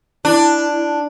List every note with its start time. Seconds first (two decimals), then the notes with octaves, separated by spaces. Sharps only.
0.25 D4 E4